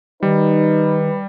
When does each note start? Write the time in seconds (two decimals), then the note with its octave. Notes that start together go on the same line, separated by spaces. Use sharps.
0.23 D#3 G3 D#4 B4